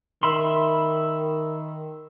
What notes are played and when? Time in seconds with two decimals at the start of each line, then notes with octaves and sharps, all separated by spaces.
0.23 D#3 E5 B5 C6